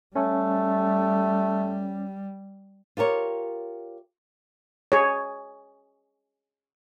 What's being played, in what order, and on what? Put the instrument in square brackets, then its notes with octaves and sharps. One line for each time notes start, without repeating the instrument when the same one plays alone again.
[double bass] G3 [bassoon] A3 [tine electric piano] C#4
[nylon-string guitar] F4 G4 A#4 C#5
[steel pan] G#4 C#5